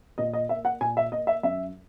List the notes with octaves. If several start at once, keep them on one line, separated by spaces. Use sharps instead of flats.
A#2 D#5
D#5
A#3 E5
F#5
A#2 G#5
E5
A#3 D#5
E5
F#2 E5